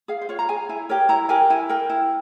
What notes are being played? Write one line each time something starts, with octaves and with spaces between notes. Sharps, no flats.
G#4 F5
C5
F4 C#5
A#5
G#4 G#5
E4 G#5
G4 A#4 C#5
E4 A#5
G4 A#4 G#5
E4 G#5
A#4 G5
E4